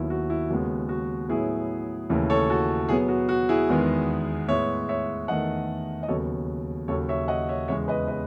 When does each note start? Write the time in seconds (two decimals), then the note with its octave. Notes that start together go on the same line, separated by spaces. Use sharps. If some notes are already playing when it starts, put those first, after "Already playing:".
Already playing: D#2 D#3 F#3 B3 E4
0.10 F#4
0.30 E4
0.50 D#2 C#3 G#3 B3 F#4
0.89 F#4
1.29 A2 F#3 B3 E4 G#4
2.10 D#2 C#3 E3 A3
2.30 A4 C#5
2.50 F#4 A4
2.89 B2 F#3 B3 E4 G#4
3.09 F#4
3.29 F#4
3.49 E4 G#4
3.69 E2 D#3 G#3 B3
4.48 A2 G#3 B3 C#5 E5
4.89 C#5 E5
5.28 E2 D#3 A3 D#5 F#5
6.03 D#5
6.08 D#2 C#3 F#3 B3 A4 C#5
6.88 D#2 C#3 F#3 A4 C#5
7.09 C#5 E5
7.28 D#5 F#5
7.49 C#5 E5
7.68 E2 C#3 G#3 B3 C#5 E5
7.88 B4 D#5
8.08 B4 D#5